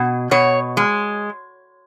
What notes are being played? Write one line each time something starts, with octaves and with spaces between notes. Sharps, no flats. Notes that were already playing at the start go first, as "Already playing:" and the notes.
Already playing: B2
B2 C#5
G#3